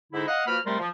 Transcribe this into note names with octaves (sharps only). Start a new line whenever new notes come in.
G#2 D3 D#4 E4
D#5 F5 F#5
F3 A#3 F#4 B4 B5 F6
C3 G3 A3 A#4 A#5 C6
F3